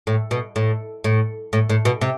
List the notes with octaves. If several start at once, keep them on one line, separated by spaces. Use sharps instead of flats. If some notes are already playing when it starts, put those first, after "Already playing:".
A2
B2
A2
A2
A2
A2
B2
C3